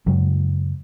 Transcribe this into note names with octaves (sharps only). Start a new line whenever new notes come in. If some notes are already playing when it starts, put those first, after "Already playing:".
F#2 C#3 F#3 G#3